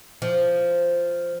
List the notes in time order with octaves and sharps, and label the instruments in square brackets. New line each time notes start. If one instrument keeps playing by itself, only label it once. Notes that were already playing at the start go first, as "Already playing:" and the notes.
[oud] F3